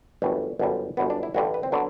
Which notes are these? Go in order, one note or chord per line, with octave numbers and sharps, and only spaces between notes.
G1 F#2 E3 G3 A3
G1 F#2 D3 G3
G1 F#2 F#3 B3
D4
E4
A1 G2 D3 G3 F#4
B4
C4
D3 F#3 B3